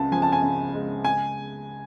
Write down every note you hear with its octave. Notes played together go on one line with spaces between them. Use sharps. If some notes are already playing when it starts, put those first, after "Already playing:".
Already playing: C#2 C#3 A5
F3 G#5
A5
G#5
C#3
G#3
G#5